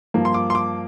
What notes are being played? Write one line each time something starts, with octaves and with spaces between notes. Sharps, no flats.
G2 F3 A#3
C6
D6
C6
D6